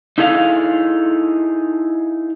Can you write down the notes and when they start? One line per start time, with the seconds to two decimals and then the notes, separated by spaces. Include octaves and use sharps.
0.18 D#4 E4 G#4 A4 F5